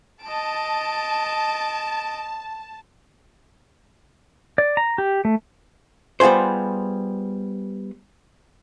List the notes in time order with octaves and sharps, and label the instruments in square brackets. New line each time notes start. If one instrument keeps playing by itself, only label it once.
[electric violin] D#5 D7 [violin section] A5
[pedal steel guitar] D5
A#5
G4
A3
[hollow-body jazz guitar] G3 B3 F4 G#4 C5